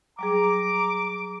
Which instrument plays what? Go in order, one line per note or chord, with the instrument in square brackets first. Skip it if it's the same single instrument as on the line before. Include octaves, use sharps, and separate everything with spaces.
[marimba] F#3 G3 G#4 [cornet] A#5 [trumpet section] D6